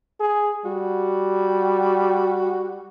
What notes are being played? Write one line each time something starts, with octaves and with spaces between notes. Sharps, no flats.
G#4
G3 F#4